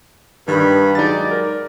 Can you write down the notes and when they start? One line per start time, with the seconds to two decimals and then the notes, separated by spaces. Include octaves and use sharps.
0.48 G2 D#3 B5
0.95 F#3 G#3 D#4 D5 A6
1.31 A#4